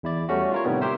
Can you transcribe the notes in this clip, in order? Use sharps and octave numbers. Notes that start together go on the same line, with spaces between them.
E2 E4 D5
G3 A3 C#4 F#4
F4 A#4 C#5
A2 C3 D#3 G3 B3
G4 A#4 C5 E5